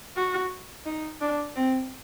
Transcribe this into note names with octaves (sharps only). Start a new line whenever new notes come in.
F#4
D#4
D4
C4